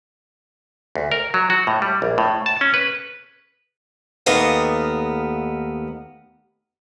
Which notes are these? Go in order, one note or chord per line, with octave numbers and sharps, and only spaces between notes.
D2
A#4
F#3
F#4
A2
G3
A#1
A2
A5
C#4
B4
D#2 A3 B3 A#4 D#5 F5